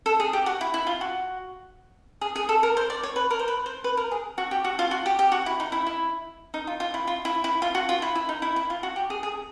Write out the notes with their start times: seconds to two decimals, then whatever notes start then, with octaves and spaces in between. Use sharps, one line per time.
0.06 A4
0.20 G#4
0.33 G4
0.46 F#4
0.61 E4
0.74 E4
0.87 F4
1.01 F#4
2.21 G#4
2.36 G#4
2.49 A4
2.63 A#4
2.77 C5
2.90 D5
3.03 C#5
3.16 B4
3.31 A#4
3.39 C5
3.48 B4
3.66 C5
3.84 B4
3.97 A#4
4.11 G#4
4.38 F#4
4.51 G4
4.64 F#4
4.79 F4
4.91 F#4
5.06 G4
5.19 G4
5.32 F#4
5.46 E4
5.60 D#4
5.72 E4
5.86 E4
6.54 D#4
6.67 F4
6.80 F4
6.94 E4
7.07 F4
7.25 E4
7.44 E4
7.62 F4
7.75 F#4
7.89 F4
8.02 E4
8.15 E4
8.29 D#4
8.42 E4
8.56 E4
8.70 F4
8.83 F#4
8.96 G4
9.10 G#4
9.23 G#4